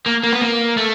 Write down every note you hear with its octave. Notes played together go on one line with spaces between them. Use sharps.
A#3
A#3
B3
A#3
A3